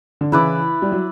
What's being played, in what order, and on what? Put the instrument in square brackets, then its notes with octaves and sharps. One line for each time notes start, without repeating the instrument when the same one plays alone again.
[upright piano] D3
[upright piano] C#3 E3 [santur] E4 B4 D5
[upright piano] G3
F#3